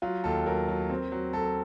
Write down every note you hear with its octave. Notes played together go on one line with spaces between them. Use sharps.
F#3 F4
D#2 A4
F#3 A#4
F#3
C4
F#3
F#3 A4